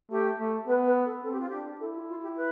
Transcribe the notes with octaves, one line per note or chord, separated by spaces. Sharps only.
A3 G4
A3
B3 B4
B4
A4
C4 A4
G4
F4
D4 G4
E4 A4
F4
F4
G4
B4